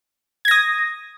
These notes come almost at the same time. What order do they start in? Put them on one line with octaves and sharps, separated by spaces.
G#6 A#6 D#6